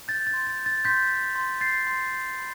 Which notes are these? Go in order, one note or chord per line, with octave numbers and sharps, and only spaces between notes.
G6 A6
A6
C6
A6
G6
A6
C6 G6 B6
G6
C6
G6 A6 C7
C6
G6
B5